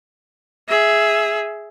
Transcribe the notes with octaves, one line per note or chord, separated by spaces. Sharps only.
G#4 E5